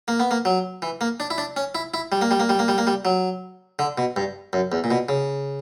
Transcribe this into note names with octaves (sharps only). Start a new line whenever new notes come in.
A#3
B3
A#3
F#3
E3
A#3
D4
E4
D4
C#4
E4
E4
G3
A#3
G3
A#3
G3
A#3
G3
A#3
G3
F#3
D3
B2
G2
F#2
E2
A#2
B2
C#3